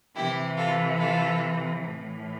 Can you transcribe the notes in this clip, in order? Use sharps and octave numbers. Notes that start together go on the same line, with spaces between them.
C3 E3 E4 G4
F4 A4
F4 A4
A2 E3